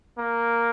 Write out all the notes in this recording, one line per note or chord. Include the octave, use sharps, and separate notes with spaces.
A#3